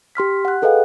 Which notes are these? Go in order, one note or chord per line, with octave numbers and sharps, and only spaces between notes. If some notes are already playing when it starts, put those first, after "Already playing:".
G4 C6 F6 B6
F#5 F#6
G#4 A4 B4 D#5 F5 G5